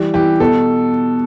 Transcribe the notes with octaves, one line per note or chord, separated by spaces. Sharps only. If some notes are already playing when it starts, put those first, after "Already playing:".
Already playing: E3 G3
E3 G4
B2 A4